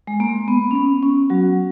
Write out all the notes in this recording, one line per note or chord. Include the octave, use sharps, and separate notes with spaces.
G#3
A#3
B3
C#4
B3
C#4
F#3 F#4